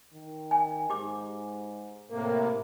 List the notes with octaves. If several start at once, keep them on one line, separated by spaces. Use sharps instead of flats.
D#3
G#5
G#2 G4 D6
A2 C3 A#3 A#4